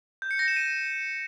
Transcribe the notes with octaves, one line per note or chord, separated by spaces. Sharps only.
G6
C#7
A#6
E7
D#7